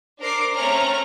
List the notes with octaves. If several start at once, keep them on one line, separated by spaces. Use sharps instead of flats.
D4 A#4 C5 D6 C7
A3 C4 C#4 C#5 A#5 F6